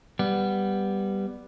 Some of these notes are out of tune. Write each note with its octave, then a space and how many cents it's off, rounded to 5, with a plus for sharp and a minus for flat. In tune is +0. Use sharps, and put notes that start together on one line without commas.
G3 +0 B3 +0